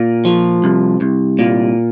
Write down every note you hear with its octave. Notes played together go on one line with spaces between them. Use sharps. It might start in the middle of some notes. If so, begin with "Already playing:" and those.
Already playing: A#2
F3
C2
C2
A#2